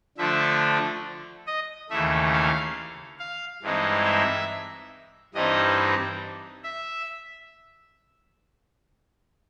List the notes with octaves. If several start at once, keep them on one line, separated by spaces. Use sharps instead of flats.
D3 F3 A3 D4 E5
D#5
D#2 C#3 E3 A3 E5
F5
F5
G2 E3 G#3 C4 D#4
E5
G2 E3 G3 C4 D#4 D#5
E5